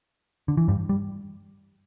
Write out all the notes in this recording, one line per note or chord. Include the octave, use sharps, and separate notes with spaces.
D3
E3
G2 G3
G3